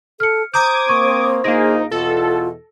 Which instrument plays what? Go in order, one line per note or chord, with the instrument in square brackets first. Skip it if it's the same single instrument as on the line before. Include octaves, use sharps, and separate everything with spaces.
[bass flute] A4 [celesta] F6 C#7
[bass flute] C5 [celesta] A#5 G6 [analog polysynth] D6 D#6 G#6
[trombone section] A#3 C4 [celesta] C#6
[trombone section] A#1 D#4 [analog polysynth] A#3 G#4 [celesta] A#6 D7
[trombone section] E2 B2 [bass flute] F4 [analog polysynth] A4